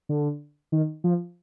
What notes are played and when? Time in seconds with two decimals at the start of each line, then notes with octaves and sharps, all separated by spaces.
0.09 D3
0.72 D#3
1.04 F3